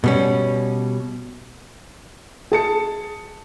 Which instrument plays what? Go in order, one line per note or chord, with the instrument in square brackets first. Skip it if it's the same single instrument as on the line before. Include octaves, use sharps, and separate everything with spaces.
[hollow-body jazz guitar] B2 G3 C#4
[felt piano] G#4 A5 C#7